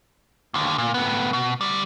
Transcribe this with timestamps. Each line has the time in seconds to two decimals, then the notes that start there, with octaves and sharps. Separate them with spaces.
0.54 D#2 D3
0.78 A#2
0.94 A2 B3
1.33 B2
1.61 D2 G3